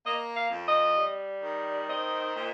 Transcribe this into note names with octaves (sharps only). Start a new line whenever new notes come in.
A#3 D#5
F5
F2
D#5
G3
D#3
C4 D#5
A#2